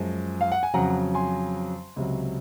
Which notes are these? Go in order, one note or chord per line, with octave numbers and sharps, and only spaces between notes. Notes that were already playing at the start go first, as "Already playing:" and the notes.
Already playing: F#2 F3 G#3
F5
F#5
G#5
F2 C#3 F#3 F#5 A#5
G#5 C6
C#2 C3 F#3